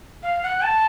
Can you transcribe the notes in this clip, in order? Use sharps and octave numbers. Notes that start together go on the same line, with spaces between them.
F5
F#5
A5